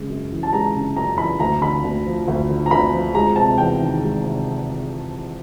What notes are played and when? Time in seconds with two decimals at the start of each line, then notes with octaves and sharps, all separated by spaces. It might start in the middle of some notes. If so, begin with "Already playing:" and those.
Already playing: C#3 G#3
0.09 F#2
0.31 E3
0.43 A5
0.53 G#3 A#5
0.74 C#3
0.96 F#2 A#5
1.18 E3 B5
1.40 D2 A#5
1.62 D3 B5
1.84 D2
2.06 F3
2.28 D2
2.49 D3
2.66 A#5
2.71 D2 B5
2.93 F3
3.14 G#3 A#5
3.36 C3 A5
3.58 E2 G5
3.80 D#3
4.02 G#3
4.24 C3